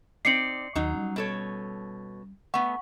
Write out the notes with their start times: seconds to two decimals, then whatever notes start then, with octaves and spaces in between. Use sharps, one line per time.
0.25 C4 D#4 D5 C7 C#7 F#7
0.75 D#2 F#3 D#4
0.94 G3 C#4
1.16 B2 A4 C#5
2.54 A3 B3 F#5 C#6